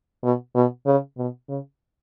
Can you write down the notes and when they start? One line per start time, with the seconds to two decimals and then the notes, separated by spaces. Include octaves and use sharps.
0.23 B2
0.55 B2
0.86 C#3
1.18 B2
1.49 C#3